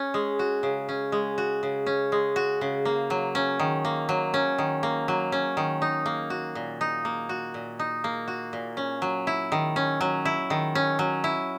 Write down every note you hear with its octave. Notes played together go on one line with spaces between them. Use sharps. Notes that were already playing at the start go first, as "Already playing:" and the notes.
Already playing: C#4
G#3
F#4
C#3
C#4
G#3
F#4
C#3
C#4
G#3
F#4
C#3
A#3
F#3
C#4
D#3
A#3
F#3
C#4
D#3
A#3
F#3
C#4
D#3
D#4
A#3
F#4
A#2
D#4
A#3
F#4
A#2
D#4
A#3
F#4
A#2
C#4
F#3
E4
D#3
C#4
F#3
E4
D#3
C#4
F#3
E4